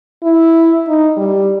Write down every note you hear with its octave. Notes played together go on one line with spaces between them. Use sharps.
E4
D#4
G3